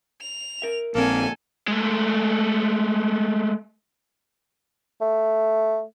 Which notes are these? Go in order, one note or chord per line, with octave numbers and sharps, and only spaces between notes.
F7
A#4 E5
A#1 A#3 C4 A4 A#4 G#5
G#3 A3
A3